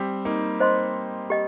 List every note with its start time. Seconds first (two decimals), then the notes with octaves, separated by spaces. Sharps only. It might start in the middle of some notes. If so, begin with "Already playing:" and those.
Already playing: G3 C4
0.25 A#3 D#4
0.60 C5 D#5 C6
1.30 G4 D#5